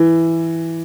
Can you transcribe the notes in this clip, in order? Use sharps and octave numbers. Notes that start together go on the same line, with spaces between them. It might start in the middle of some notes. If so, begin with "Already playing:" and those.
Already playing: E3